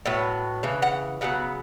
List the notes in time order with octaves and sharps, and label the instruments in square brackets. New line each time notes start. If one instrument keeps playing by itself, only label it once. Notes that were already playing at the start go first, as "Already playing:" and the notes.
[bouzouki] A2 F#3 B3
C#3 E3
F#5
C#3 F#3 B3 F#5